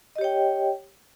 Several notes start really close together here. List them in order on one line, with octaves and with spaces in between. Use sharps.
D#5 G4 C#5 G5